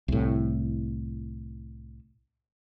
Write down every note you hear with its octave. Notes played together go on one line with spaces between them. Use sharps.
C2 A2